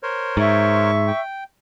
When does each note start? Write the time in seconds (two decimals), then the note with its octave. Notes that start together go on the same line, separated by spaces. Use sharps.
0.03 A#4 C5 C#5
0.37 G#2 E5 C#6
1.07 G5